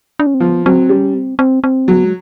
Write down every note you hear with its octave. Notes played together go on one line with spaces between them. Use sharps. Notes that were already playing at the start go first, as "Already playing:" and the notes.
D4
C#4
C4
F3 B3
F#3 C4
G3 C#4
C4
C4
C4
F#3 B3
G#3